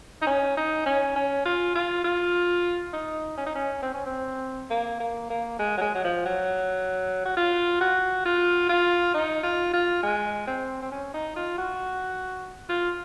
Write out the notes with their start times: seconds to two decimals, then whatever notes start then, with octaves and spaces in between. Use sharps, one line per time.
0.22 D#4
0.27 C#4
0.57 D#4
0.86 C#4
1.16 C#4
1.45 F4
1.75 F4
2.04 F4
2.93 D#4
3.37 C#4
3.46 D#4
3.55 C#4
3.82 C4
3.94 C#4
4.06 C4
4.70 A#3
5.00 A#3
5.30 A#3
5.59 G#3
5.77 F#3
5.81 G#3
5.95 F#3
6.04 F3
6.26 F#3
7.25 F#4
7.37 F4
7.81 F#4
8.26 F4
8.69 F4
9.14 D#4
9.43 F4
9.73 F4
10.03 G#3
10.47 C4
10.82 C4
10.92 C#4
11.14 D#4
11.36 F4
11.58 F#4
12.69 F4